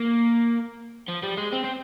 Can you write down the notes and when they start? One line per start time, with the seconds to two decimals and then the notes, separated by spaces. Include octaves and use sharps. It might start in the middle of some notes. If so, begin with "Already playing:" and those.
Already playing: A#3
1.09 F3
1.23 G3
1.37 G#3
1.53 C4
1.64 C4